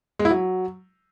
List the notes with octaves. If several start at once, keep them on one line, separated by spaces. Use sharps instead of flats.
G#3
E4
F#3